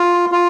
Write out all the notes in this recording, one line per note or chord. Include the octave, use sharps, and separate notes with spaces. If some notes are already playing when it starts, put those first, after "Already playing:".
Already playing: F4
F4